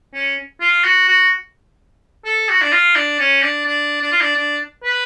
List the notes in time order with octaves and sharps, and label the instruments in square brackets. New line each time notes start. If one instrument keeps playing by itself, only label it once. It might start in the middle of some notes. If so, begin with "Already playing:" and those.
[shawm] C#4
F4
F#4
F#4
A4
F#4
D4
F4
D4
C#4
D4
D4
D4
F4
D4
D4
B4